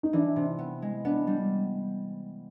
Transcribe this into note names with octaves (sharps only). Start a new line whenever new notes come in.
D#4
E3 D4
C3
B3
G#3
B3 D4
G3